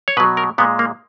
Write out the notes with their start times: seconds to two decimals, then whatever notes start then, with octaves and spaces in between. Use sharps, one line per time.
0.08 C#5
0.17 B2 B4
0.20 F#3
0.37 A#4
0.58 A#2 G#3 B3
0.79 A#3